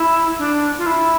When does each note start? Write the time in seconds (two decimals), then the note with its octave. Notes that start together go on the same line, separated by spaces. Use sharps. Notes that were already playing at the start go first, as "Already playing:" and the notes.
Already playing: E4
0.39 D4
0.78 F4
0.86 E4